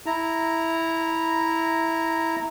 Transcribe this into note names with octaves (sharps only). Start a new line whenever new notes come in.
E4 A#5